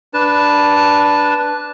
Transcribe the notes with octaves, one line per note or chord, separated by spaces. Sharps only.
D4 B4 A5